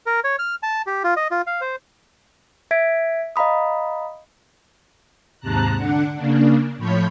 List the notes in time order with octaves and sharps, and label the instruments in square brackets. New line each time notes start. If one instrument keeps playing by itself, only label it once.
[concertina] A#4
C#5
F6
A5
G4
F4
D#5
F4
F5
C5
[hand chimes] E5 G#6 B6 D7
D#5 F5 A#5 B5 D#6
[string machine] D#2 G#2 C3 A5 A#5 F#6
D3 D4 F#5
C#3 A#3 D4
A2 F3 C#5 B5 G6